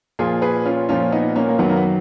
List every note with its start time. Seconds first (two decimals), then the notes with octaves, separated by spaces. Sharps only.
0.19 A#2 F3 F4 G#4
0.42 G#4 B4
0.66 C#4 F4
0.89 A#2 F3 C#4 F4
1.12 B3 D#4
1.36 A#3 C#4
1.48 A#3
1.58 F#2 D#3 F#3 B3
1.69 A#3
1.76 B3